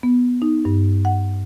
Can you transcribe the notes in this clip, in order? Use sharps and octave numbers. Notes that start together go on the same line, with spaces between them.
B3
D#4
G2
F#5